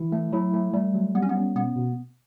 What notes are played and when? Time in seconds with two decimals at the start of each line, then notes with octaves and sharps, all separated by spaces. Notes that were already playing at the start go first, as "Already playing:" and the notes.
Already playing: E3 E4
0.12 A3
0.32 F#3 E4
0.53 A3
0.73 G3 A3
0.94 F#3
1.15 G3 B3
1.22 C#4
1.29 B3
1.35 C#4
1.55 B2 B3
1.75 B2